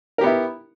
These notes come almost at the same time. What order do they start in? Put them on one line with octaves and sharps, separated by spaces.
A#4 G4 B3 E4